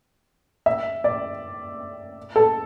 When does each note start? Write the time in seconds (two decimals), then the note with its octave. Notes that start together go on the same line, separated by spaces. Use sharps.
0.66 E5
1.04 D5
2.36 A4